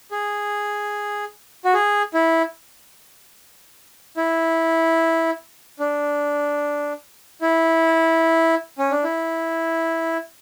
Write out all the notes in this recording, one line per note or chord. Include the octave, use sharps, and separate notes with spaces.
G#4
F#4
G#4
E4
E4
D4
E4
C#4
D4
E4